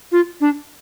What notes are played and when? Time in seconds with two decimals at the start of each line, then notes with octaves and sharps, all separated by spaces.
0.12 F4
0.41 D4